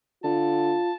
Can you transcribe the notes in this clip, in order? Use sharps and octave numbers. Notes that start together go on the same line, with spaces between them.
D3 F4 A5